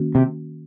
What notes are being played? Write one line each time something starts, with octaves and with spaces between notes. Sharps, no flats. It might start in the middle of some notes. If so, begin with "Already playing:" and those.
Already playing: D#3 A#3 C#4 F#4
C3